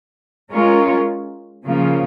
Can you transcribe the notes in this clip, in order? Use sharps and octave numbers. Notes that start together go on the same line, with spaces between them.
G#3 C#4 F4 A#4 C#5
C#3 F3 A#3 F4